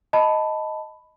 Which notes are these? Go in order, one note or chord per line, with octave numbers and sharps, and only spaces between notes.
D#5 A5 B5